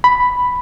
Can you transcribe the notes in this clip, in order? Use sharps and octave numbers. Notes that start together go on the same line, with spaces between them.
B5